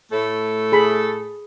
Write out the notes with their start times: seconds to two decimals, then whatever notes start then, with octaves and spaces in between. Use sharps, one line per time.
0.11 A2 A3 A4
0.72 G#4 B5